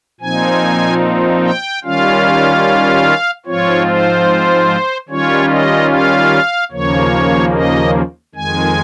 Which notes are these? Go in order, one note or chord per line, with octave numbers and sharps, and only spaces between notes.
A#2 F3 C4 D#4 G#5
G5
D#3 G3 C#4 F4 F5
G#2 F3 C4 F4 C#5
C5
D#3 G3 C#4 F4 C#5
D#5
F5
D#2 C#3 F3 A#3 C#5
D#5
F2 D#3 G#3 G#5